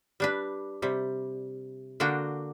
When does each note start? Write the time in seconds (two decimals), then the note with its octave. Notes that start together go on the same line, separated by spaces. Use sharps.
0.20 G3 D4 B4
0.82 C3 G3
2.00 D3 A#3 D4 F#4 G5